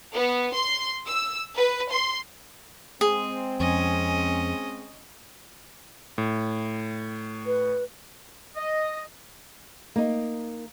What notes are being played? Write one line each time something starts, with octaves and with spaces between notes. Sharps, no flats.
B3
C6
E6
B4
C6
G#3 C4 G#4
F2 C#4 D#5
A2
B4
D#5
A#3 D#4